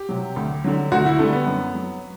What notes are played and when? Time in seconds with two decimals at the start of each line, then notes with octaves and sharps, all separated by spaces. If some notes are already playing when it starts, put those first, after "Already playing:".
Already playing: G4
0.09 C3 F#3
0.36 D2
0.64 D3 F#3
0.92 D2 F#4
1.06 E4
1.19 D3 G3 A3
1.33 B3
1.47 F#2
1.75 F#3